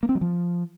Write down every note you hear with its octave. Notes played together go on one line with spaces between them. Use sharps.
A#3
C4
F#3
F3